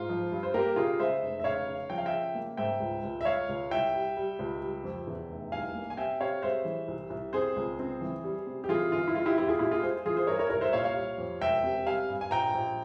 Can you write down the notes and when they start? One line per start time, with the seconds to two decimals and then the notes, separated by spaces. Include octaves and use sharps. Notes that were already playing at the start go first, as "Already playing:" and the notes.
Already playing: G#2 F4
0.09 F3
0.32 G2
0.43 C5
0.54 A#3 G4 A#4
0.76 C#3 F4 G#4
0.99 G#3 C5 E5
1.23 F1
1.40 E5
1.44 C#3 C#5 F5
1.67 C#3
1.90 F3 G5
1.98 F5
2.06 E5 G5
2.13 C#3
2.35 A#3
2.57 G#2 E5 G5
2.80 C#2
3.04 C#2
3.21 E5
3.25 C#2 C#5 F5
3.49 C#2
3.71 C2 E5 G5
3.94 G3
4.17 G3
4.39 C#2
4.61 G3
4.84 F2
5.07 E2
5.30 F1
5.52 C2 F5 G#5
5.75 A#3
5.90 G#5
5.97 C3 E5 G5
6.20 C3 C#5 F5
6.42 G#3 C5 E5
6.65 E3
6.88 C2
7.10 C2
7.33 C4 G#4 C5
7.56 C#2
7.79 C4
8.01 E3
8.24 G3
8.47 C3
8.64 G4
8.69 E3 F4 G#4
8.92 G1 F4
9.08 E4
9.14 G#3 F4
9.25 E4 G4
9.38 E2 E4 G4
9.48 F4 G#4
9.59 A#2 E4 G4
9.71 F4 G#4
9.82 G#3 G#4 C5
10.05 E3 F4 G#4
10.17 G#4 C5
10.27 G2 A#4 C#5
10.39 A#4 C#5
10.50 C2 A#4 C#5
10.61 C5 E5
10.73 A#2 C#5 F5
10.84 C#5 F5
10.95 G3
11.18 F2
11.41 E1 E5 G5
11.64 C3
11.86 G3 F5 G#5
12.09 G2
12.21 G#5
12.31 A#1 G5 A#5
12.55 A#1